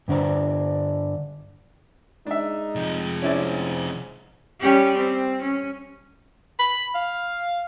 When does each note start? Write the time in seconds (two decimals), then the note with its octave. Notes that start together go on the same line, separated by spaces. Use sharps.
0.08 G2 D3 D4 C5 A#5
2.27 G#3 D4 D#4 E5
2.75 C3 F3
3.22 G#2 C#4 E4 D5
4.60 G3 C#4 G4
4.97 C4
5.42 C#4
6.59 B5
6.94 F5